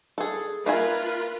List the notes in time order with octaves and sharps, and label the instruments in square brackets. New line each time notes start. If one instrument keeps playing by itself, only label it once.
[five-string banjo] G#4 A4
[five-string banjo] A#3 E5 G#5 [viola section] F4 A#4 B4